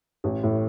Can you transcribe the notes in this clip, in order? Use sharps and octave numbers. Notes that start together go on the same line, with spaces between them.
A1
A2